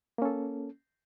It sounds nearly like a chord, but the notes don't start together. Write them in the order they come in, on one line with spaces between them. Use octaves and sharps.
A#3 C#4 A4